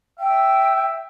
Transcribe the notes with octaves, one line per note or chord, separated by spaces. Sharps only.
E5 G5